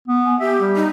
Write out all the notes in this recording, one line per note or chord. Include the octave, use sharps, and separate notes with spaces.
B3
G#5
G4 E5
G3
D#4